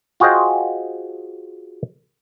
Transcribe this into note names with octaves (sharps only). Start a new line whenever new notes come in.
F4 F#4 G#4 C5 D#5 G5